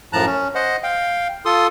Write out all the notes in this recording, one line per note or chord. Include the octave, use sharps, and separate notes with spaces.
F#2 A2 F3 A5 A#5 F#6
C#4
C5 D#5 F#5
F5 G5
F4 A4 C6 D#6